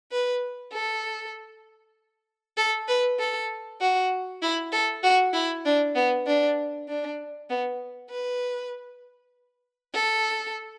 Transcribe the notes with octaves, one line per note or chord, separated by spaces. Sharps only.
B4
A4
A4
B4
A4
F#4
E4
A4
F#4
E4
D4
B3
D4
D4
B3
B4
A4